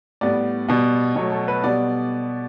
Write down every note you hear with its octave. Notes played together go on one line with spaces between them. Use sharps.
A2 G3 B3 D5
B2 G3 B3
B2 F#3 A3 C#5
A4
B4
B2 G3 B3 D5